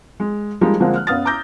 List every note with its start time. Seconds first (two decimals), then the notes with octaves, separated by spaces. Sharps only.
0.20 G#3
0.61 F3 G3 G#3 A#3 D#4 G#4
0.80 D3 F3 G#3 A#3 C4 D4
0.96 F6 F#6
1.07 F#1 B3 F5 D#6 F6 A6
1.25 A#5 D6 E6 G6 A#6